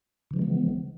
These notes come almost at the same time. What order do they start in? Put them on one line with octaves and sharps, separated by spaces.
C#3 E3 F3 G#3 B3